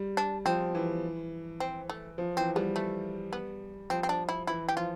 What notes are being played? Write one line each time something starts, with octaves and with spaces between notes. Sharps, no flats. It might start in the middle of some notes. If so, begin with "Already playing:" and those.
Already playing: G3
D4
F3 C4
E3
C4
A3
F3
E3 C4
G3 B3
A3
B3
F3 C4
C4
D4
E4
E3 E4
G4
F3 F4